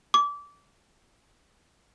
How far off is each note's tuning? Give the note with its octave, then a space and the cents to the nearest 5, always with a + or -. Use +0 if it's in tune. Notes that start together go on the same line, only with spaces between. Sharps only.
D6 -25